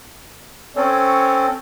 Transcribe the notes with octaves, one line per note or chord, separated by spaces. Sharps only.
C4 C#4 A4 C#5